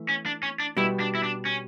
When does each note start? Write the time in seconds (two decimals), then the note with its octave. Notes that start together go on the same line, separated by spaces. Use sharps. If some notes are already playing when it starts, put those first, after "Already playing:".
Already playing: E3 A3
0.09 C#4
0.26 D4
0.43 C#4
0.60 D4
0.77 B2 G3 B3 E4
1.00 D4
1.15 E4
1.23 D4
1.45 C#4